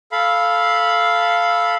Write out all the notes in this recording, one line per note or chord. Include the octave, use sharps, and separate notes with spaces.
A4 F5 B5